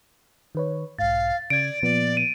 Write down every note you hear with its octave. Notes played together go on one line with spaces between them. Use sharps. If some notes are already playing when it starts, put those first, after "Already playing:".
D#3 B4 C#5
B1 G#2 F5 A6
C#3 D5 G#6 D7
A#2 F3 B3 D5
D#7